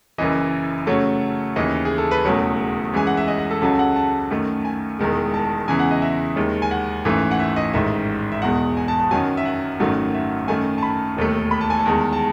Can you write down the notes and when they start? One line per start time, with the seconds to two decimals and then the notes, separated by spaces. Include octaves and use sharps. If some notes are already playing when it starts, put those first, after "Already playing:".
0.18 F#1 F#2 E3 D#5
0.87 F#2 C#3 F#3 A3 C#5
1.56 D#2 C#3 E3 D#5
1.85 G#4
1.98 A4
2.11 B4
2.24 E1 E2 C#3 F#3 A3 C#5
2.93 F#2 E3 G#3 G#5
3.07 F#5
3.17 E5
3.28 D#5
3.38 F#5
3.51 A4
3.62 C#2 C#3 F#3 A4
3.79 F#5
3.96 A5
4.31 F#2 D#3 A3
4.65 G#5
4.99 E1 E2 D#3 G#3
5.34 A5
5.68 E2 C#3 E3 G#5
5.79 F#5
5.91 D#5
6.02 E5
6.36 D#2 D#3 G#3
6.62 G#5
6.71 F#5
7.05 G#1 F#2 E3 A3
7.31 F#5
7.39 E5
7.56 D#5
7.74 A1 G#2 D#3 E5
8.32 E5
8.42 E1 E2 B2 G#3 F#5
8.77 G#5
8.88 A5
9.00 A5
9.11 F#2 D#3 F#3 G#5
9.37 E5
9.45 F#5
9.80 G#1 F#2 D#3 F#3 A3
10.14 E5
10.48 F#2 D#3 A3 G#5
10.78 A5
10.83 B5
11.17 E1 D#2 D#3 A3
11.51 B5
11.61 A5
11.70 G#5
11.79 A5
11.86 E2 D#3 G#3
12.13 A5